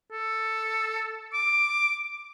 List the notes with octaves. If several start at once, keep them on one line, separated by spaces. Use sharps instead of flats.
A4
D6